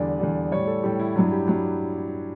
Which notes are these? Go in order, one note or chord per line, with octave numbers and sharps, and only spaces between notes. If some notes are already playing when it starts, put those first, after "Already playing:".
Already playing: E2 D3 G3 D5
E2 D3 G3
A2 G3 C#5
A4
A2 G3 G4
E4
G2 F#3 E4
G4
G2 F#3